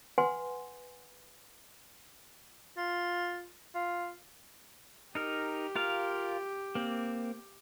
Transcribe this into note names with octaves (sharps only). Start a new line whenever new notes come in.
B4 F#5 G#5 C6
F4
F4
D#4 G4 A#4
F4 A#4 F5
A#3 C4